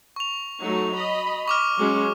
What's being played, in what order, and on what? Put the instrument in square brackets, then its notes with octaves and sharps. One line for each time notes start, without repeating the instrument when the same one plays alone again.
[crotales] C#6 F7
[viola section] F#3 A3 D#4
D#5 B5
[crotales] C#6 D6 F6
[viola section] F#3 G#3 C#4